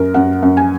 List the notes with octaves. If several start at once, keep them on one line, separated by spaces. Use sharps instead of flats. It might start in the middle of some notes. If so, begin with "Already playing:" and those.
Already playing: F#2 A#4
F#2 F#5
F#2
G#5